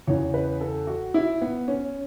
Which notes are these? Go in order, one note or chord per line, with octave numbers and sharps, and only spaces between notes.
E2 C#3 E3 C#5
B4
A4
F#4
E4
B3
C#4